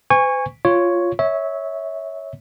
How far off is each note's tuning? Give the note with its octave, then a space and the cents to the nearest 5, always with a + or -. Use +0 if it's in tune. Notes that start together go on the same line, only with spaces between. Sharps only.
C5 -45 G#5 -25 C#6 +0
F4 +0 C#5 +0
C#5 +0 E5 -25